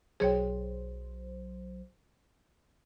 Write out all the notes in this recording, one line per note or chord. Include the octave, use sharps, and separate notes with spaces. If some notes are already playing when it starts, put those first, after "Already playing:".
B1 F#3 G#4 C5 C#5 G5